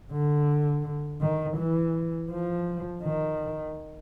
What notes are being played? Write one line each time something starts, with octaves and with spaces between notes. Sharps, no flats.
D3
D#3
E3
F3
D#3